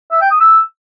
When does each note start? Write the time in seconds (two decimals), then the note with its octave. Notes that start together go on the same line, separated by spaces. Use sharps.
0.12 E5
0.21 G5
0.31 D#6
0.40 E6